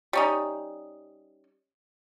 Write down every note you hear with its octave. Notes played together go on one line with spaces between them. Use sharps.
G3 C#4 D#4